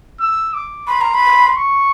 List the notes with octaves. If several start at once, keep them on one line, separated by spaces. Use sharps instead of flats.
E6
D6
B5 C6
A#5
B5
C#6